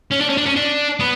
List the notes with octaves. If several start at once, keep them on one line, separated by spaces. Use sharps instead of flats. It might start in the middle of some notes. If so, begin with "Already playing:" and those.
C#4
D4
C#4
D4
C#4
D4
B3